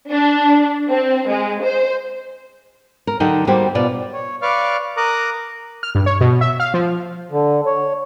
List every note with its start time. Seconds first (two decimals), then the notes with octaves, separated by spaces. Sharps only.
0.10 D4
0.89 C4
1.28 G#3
1.63 C5
3.07 A#4
3.20 D3 F#3 D#4 G4 A#4
3.47 G3 A#3 F#4 G4 C5
3.75 B2 F4 D5
4.13 C#5
4.42 B4 D5 F5 C#6 D6 F6
4.97 A#4 A#5 D6 D#6 F#6
5.83 F6
5.95 G2
6.06 C#5
6.21 B2
6.41 E5
6.60 F5
6.74 F3
7.31 D3
7.66 C#5